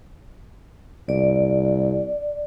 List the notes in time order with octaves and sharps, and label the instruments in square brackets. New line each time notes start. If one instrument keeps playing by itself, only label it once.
[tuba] C2 [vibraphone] D5